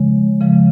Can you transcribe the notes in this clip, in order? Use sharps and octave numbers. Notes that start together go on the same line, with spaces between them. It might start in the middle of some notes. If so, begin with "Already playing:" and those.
Already playing: C#3 F3 G#3
C#3 F3 G#3